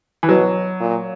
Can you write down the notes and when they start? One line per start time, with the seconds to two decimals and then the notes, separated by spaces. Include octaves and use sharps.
0.23 E3
0.29 B2 F#3
0.80 A#2